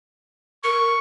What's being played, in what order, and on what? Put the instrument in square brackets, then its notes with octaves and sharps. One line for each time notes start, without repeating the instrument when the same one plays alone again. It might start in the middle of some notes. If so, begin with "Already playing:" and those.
[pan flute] A#4 [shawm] C#6